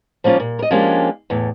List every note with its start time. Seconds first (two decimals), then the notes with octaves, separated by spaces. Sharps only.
0.24 F3 G3 A#3 C#4 F4
0.40 A#2
0.59 A#4 D#5
0.71 F3 G#3 A#3 C#4 D4 G4
1.30 E2 A2